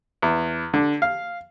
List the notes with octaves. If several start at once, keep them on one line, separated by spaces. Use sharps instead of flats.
E2
D3
F5